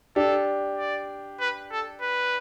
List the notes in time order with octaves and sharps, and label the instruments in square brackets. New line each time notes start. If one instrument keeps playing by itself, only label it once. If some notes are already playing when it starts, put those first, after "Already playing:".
[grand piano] D4 G4 [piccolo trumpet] A4
[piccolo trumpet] D5
B4
A4
B4